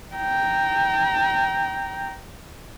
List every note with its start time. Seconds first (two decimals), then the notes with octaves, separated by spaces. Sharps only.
0.15 G5 A#5